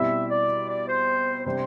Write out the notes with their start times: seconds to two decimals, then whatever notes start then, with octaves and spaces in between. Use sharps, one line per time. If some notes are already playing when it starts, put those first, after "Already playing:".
Already playing: B2 G3 C4 E4 G4 E5
0.30 D5
0.69 D5
0.88 C5
1.45 C3 G3 D4 G4 C5